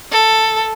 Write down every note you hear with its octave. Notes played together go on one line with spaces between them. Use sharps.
A4